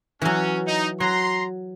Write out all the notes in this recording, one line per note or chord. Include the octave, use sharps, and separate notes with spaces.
E3 F#3 C#4
D#4
F#3 A#5 C6